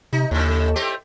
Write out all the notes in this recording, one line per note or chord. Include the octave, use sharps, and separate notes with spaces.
C3 D#4
D#2 A2 C#3
A3 C4 G4